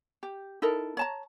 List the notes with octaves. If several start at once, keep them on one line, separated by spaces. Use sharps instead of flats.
G4
D#4 E4 A4 A#4
C#5 A5 A#5